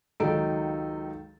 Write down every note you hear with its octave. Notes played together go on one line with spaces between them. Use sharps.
C#2 D#3 F#3 D#4 A4 D7